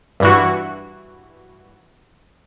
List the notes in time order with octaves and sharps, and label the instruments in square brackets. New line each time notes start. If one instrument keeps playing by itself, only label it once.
[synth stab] G2 E3 F#4